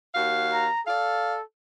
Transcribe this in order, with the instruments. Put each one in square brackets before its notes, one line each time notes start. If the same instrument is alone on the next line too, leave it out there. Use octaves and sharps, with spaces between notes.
[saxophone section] D#2 F#4 F5
[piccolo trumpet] A#5
[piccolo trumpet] A4 [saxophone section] D5 F5